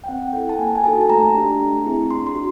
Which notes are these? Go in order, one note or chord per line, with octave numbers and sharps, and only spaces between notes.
G5
C4 F#5
F#5
E4 A4 G5
A5
A#3 G#5
G#5
D#4 F#4 A4 A5
A5
A3 A#5
D4 G4
A3
C4 E4 G#4
D4 C6
C6
F#4